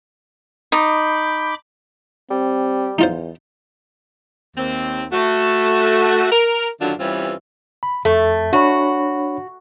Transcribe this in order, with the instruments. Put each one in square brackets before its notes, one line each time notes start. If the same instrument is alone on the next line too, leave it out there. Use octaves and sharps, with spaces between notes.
[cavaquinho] D#4 [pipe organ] B5 D6 G6
[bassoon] G3 [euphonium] C4
[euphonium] E2 [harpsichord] D#4 F4 C5
[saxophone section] D#2 C4
A3 F#4
A#4
F#2 D3 D#3 F#3 D4 F4
G2 E3 G3 C4 C#4 F4
[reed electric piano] B5
[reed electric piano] F2 A4 [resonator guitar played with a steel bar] A3
[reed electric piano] D4 C#5 B5 [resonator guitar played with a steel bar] F#4